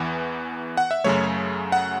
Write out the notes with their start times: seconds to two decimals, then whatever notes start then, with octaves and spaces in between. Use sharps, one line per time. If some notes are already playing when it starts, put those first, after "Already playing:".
Already playing: E2 E3 B3
0.77 F#5
0.91 E5
1.04 F#2 C#3 F#3 A3 C#5
1.72 F#5